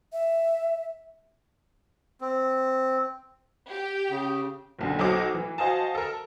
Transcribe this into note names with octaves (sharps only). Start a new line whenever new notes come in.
E5
C4
G4 G5
C#3
F#1 B1 D3
B1 F#3 C5 D#5 D6
E3
F#4 C5 D#5 F5 G#5 A5
A4 A#4